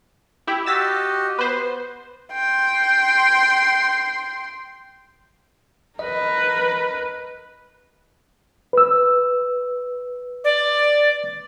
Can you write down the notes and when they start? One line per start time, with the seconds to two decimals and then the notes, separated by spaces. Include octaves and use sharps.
0.47 E4 G4
0.66 F#4 G4 D#5 E6 A6 B6
1.39 B3 B4 C5
2.32 G5 C6
5.99 A#4 B4 D#5
8.73 B4 E6
10.44 D5